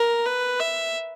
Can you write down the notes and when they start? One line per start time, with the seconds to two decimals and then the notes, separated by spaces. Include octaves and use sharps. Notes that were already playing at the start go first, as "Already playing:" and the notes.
Already playing: A#4
0.26 B4
0.60 E5